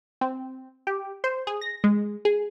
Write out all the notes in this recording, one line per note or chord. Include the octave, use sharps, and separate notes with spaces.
C4
G4
C5
G#4
A#6
G#3
G#4